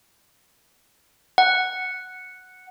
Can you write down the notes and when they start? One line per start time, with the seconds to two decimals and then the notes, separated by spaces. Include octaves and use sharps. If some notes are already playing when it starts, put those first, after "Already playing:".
1.38 F#5